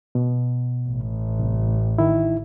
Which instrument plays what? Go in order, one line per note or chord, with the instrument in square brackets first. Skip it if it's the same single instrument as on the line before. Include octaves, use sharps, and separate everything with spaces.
[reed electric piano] B2
[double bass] A1
[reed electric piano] C2
D#3 E4